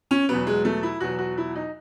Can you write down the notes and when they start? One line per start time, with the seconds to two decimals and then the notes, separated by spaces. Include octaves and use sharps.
0.11 C#4
0.29 E2 B2 F#3 B3
0.47 G#3
0.65 A3
0.83 E4
1.00 E2 B2 F#3 F#4
1.19 F#4
1.37 E4
1.55 D#4